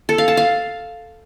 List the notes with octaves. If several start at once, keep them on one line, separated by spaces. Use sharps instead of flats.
A4
F5
A5
F5